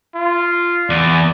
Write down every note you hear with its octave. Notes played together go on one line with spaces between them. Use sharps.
F4
E2 D5